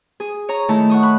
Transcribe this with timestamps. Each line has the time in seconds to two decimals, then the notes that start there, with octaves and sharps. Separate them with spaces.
0.20 G#4
0.49 C#5 A#5
0.69 D#3 A3 E4 A5
0.89 F#5 C#6 D#6
1.02 B5 F#6